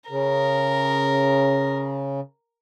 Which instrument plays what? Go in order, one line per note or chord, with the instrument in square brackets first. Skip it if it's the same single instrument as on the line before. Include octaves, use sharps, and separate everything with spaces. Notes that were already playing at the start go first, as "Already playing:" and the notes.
[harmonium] C#3 [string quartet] A#4